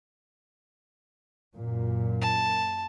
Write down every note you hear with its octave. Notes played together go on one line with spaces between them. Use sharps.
F#2 A#2
A5